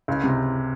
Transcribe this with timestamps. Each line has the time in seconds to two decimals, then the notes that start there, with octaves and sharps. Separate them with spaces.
0.08 C#2
0.24 C3